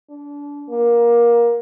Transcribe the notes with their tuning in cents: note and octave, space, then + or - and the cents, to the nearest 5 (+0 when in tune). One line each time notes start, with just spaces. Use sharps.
D4 -30
A#3 +20